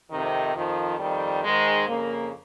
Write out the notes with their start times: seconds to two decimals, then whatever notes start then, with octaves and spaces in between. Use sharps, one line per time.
0.11 F2 C3 D#3
0.56 F2 D#3 F3
0.99 F2 D#3 G3
1.44 G#2 D#3 G#3
1.88 F2 C#3 A#3